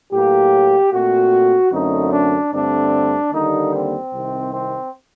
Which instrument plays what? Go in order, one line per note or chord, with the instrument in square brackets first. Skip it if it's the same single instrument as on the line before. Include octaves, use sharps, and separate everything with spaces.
[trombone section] A2 F#3 A#3 G4
A#2 A3 C4 F#4
F#2 D3 A3 C4 D#4
D4
G2 D3 A3 C4 D4
D#2 D3 G3 A#3 D#4
C4
C2 C3 D#3
C4